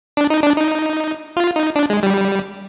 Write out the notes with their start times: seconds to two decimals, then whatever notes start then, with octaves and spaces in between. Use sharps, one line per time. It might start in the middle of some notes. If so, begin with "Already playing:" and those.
0.17 D4
0.30 D#4
0.43 D4
0.57 D#4
1.37 F4
1.56 D#4
1.76 D4
1.90 G#3
2.03 G3